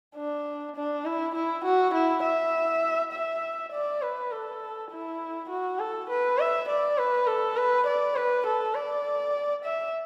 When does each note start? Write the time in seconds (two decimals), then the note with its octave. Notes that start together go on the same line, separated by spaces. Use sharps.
0.16 D4
0.77 D4
1.05 E4
1.35 E4
1.65 F#4
1.94 E4
2.23 E5
3.13 E5
3.72 D5
4.02 B4
4.32 A4
4.91 E4
5.50 F#4
5.79 A4
6.10 B4
6.39 E5
6.69 D5
6.98 B4
7.27 A4
7.57 B4
7.87 D5
8.16 B4
8.46 A4
8.75 D5
9.64 E5